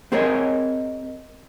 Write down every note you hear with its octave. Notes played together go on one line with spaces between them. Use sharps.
C4 G#4 A#4 C#5 D#5